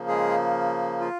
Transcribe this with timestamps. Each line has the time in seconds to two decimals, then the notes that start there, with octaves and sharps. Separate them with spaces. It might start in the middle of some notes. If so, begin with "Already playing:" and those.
Already playing: C#3 F3 A#3
0.08 G#3 G#4
1.01 F4